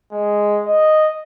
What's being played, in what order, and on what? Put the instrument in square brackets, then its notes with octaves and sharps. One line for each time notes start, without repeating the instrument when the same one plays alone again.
[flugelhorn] G#3
D#5